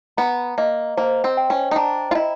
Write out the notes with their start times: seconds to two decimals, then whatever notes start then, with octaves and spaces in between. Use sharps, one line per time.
0.17 B3 A#5
0.58 A#3 D#5
0.97 A#3 C5
1.24 C4
1.37 G5
1.50 C#4
1.71 D#4
1.76 D4 A#5
2.11 F4
2.15 E4 D#5